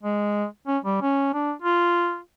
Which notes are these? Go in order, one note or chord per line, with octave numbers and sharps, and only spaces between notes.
G#3
C#4
G3
C#4
D4
F4